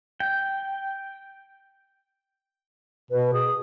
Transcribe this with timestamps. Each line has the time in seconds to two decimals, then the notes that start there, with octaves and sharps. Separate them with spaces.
0.20 G5
3.11 B2 B4
3.34 G#4 D#6